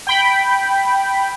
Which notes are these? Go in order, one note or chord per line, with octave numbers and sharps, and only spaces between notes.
G5 B5